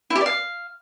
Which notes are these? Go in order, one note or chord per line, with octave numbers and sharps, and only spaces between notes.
E4
G4
D5
F5